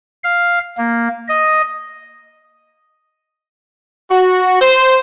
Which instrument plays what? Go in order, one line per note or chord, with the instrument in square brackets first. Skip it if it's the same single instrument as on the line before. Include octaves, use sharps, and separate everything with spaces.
[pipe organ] F5
A#3
D#5
[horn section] F#4
C5